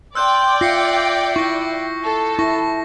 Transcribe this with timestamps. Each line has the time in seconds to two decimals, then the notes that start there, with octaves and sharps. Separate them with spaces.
0.15 D5 G5 C6 E6 F#6 G6
0.61 F4 E5 A#6 C7 C#7
1.36 E4 C#6 A#6
2.04 A4
2.39 E4 A5 C#6 A#6